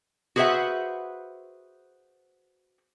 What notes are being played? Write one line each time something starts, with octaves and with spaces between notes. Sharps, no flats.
F#4 G#4 B4 C5 E5 F#5